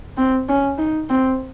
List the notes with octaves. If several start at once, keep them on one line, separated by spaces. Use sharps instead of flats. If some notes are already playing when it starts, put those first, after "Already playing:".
C4
C#4
D#4
C4